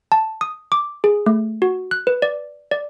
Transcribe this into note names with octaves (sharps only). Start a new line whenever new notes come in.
A5
D#6
D6
G#4
A3
F#4
F#6
B4
D5
D5